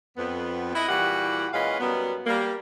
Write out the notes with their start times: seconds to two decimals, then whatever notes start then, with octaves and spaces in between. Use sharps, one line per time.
0.17 F2 B3
0.75 E4 D#5 F#5
0.89 A#2 E3 G3 F#4 G4 F#5
1.54 A#2 G#3 C#4 B4 D#5 F5
1.80 F#2 F#3 G3 B3
2.27 G3 A#3